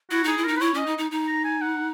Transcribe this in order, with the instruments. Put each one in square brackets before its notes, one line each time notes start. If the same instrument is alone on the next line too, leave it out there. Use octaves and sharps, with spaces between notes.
[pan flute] E4 [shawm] F#4
[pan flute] D#4 [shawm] G#4
[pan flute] E4
[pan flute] D#4 [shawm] A#4
[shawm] B4
[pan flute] E4 [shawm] C#5
[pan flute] C#4 [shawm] D#5
[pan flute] D#4
D#4
D#4
[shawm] A#5
G#5
F#5